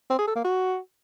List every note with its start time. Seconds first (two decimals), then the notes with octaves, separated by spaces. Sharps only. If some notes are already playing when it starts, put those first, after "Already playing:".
0.10 C4
0.19 G#4
0.27 A4
0.36 A#3
0.44 F#4